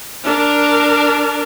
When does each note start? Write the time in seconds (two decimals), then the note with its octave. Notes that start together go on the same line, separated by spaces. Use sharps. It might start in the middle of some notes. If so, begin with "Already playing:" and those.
0.24 D4 A#4